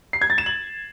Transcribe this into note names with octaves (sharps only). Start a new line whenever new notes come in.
C7
G#6
A6
E7
F#7